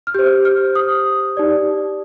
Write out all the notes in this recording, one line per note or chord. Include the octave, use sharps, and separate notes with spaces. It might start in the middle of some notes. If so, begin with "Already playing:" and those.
F6
G4 C5 G6
F6
D#6
D#4 G4 D5